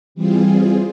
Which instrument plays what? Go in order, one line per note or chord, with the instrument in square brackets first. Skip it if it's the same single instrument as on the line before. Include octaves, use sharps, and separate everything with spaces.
[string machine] E3 G3 C4 F4 G#4